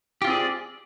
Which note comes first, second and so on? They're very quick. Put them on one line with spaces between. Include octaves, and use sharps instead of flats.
G4 F4 C4 G#4 D5